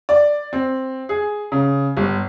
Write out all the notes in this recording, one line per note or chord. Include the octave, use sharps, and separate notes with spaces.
D5
C4
G#4
C#3
G1